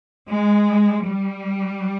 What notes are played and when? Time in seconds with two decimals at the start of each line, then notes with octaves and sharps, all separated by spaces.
0.28 G#3
1.07 G3